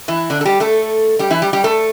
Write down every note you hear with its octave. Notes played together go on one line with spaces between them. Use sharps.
E3 E4
D3 D4
A4
G3 G4
A3 A4
G3 G4
E3 E4
G3 G4
G3 G4
A3 A4